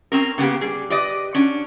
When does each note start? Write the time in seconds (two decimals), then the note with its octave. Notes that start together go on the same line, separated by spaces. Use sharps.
0.12 C4 C#4 A#4
0.38 C#3 A#3 B3 G4
0.61 G3 G#4
0.90 G4 B4 D5 D#5
1.34 C#4 D4 F#4